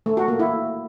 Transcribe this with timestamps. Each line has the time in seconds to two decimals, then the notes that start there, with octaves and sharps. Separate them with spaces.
0.06 A3
0.17 F#4
0.28 A#3
0.39 E4